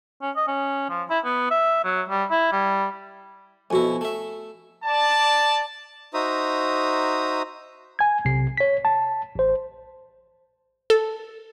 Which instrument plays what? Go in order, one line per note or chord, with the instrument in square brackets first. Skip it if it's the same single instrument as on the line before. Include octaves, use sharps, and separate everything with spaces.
[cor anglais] C#4
D#5
C#4
F3
E4
B3
E5
F#3
G3
E4
G3
[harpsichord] F2 B2 E4 [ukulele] F#4 G#5
[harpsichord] A3 E5
[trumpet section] D5 A5
[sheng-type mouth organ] D#4 F#4 C5 E5 A#5 D#6
[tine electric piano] G#5 G#6
B1 C3 C7
C#5 B6
A5
A1 C5
[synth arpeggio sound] A4